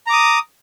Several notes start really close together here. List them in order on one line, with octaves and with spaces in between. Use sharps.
A#5 D6 D#6